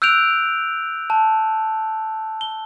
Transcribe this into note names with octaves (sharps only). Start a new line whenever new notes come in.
E6 F#6 G6 D7 F7
A5
G7